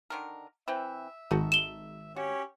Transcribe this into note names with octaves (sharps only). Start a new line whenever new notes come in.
D3 D#3 A#4
E3 C4 E5 G5
G#1 D#4 F#4 A4
E7 G7
C#4 F#4 G4 C#5